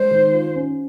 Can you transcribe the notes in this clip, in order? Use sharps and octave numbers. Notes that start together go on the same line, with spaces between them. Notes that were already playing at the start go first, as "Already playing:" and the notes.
Already playing: G#3 C5
D#3
F4
C#4